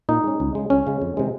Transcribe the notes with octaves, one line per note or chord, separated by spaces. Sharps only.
A#2 D#4
G#3 C#4
C#2
C#3 G#3
C#2 C#4
C#3 G#3
F2
C3 D#3 G#3